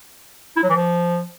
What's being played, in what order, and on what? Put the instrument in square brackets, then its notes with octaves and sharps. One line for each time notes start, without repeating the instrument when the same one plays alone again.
[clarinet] E4
F#3
E3
F3